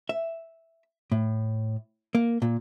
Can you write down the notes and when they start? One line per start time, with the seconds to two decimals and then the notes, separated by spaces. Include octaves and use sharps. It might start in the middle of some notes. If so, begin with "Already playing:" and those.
0.09 E5
1.12 A2
2.15 A#3
2.42 A#2